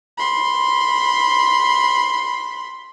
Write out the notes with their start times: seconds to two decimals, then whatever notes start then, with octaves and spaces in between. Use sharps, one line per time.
0.18 B5 C6